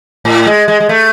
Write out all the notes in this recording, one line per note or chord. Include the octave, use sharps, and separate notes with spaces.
A2
G#3
G#3
G#3
A3